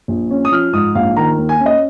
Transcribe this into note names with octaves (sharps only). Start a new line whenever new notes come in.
A#1
C#4
D#6
F3 F6
G#2 D#6
A#1 F5
D#3 A#5
D#2
G#5
C#4
D#5